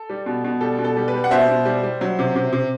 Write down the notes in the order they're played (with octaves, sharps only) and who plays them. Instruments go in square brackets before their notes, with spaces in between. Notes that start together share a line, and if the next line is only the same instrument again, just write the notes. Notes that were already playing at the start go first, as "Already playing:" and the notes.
Already playing: [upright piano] A4
G3
B2
B2
G3 A4
B2
A4
G3
B4
G3
F#5
B2 C5 E5
B2
G3
G3
F#3
C3
C3
C3